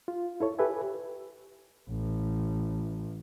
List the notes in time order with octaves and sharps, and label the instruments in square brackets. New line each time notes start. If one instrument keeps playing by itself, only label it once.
[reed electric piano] F4
E4 A4 C#5
G4 A4 B4 E5 G#5
[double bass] A1